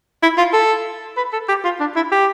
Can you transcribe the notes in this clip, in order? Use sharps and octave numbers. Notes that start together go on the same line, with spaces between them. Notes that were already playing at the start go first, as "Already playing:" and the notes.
E4
F4
A4
B4
A4
G4
F4
D4
E4
G4